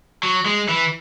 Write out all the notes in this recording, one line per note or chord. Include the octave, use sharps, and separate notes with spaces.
F#3
G#3
E3